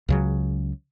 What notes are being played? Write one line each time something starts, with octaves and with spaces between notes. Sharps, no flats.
C#2 C#3 F#3